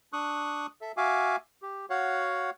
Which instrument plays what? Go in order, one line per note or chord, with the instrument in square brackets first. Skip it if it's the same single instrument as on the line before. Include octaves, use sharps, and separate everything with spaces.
[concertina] D4 C#6 D#6 F#6
A4 E5
F#4 E5 F5 G#5 D6
G4
F#4 C#5 F5 F#5